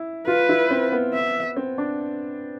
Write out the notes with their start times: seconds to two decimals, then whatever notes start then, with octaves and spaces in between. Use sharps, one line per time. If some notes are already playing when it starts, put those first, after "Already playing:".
Already playing: E4
0.27 F4 B4
0.49 E4
0.70 C4
0.92 B3
1.14 E5
1.56 C4
1.78 D4